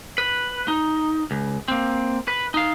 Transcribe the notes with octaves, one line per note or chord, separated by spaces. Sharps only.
B4
D#4
C#2
A#3 C4
B4
D#4 F5